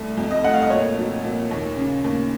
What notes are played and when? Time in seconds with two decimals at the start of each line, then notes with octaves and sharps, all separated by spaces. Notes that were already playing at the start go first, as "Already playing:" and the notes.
Already playing: C2 A3
0.17 F2
0.31 D#5
0.44 A3 F#5
0.53 F5
0.62 D#5
0.70 A#2 C#5
0.97 F#3
1.24 A#2
1.51 D#2
1.77 C#3
2.04 D#2